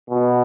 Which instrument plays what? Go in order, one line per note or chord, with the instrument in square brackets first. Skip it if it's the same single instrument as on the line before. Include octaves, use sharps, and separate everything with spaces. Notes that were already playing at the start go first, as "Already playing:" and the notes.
[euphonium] B2